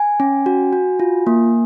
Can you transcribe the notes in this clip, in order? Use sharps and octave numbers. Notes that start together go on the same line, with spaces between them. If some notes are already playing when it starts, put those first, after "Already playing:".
Already playing: G#5
C#4
F#4
F#4
F4
A#3